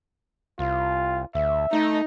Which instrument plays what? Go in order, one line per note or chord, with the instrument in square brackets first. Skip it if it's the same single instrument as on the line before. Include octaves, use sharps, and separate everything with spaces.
[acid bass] C2 [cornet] F4
[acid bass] D2 [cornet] E5
[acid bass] A3 [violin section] D#4